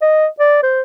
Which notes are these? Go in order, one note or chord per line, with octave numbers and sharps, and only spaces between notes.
D#5
D5
C5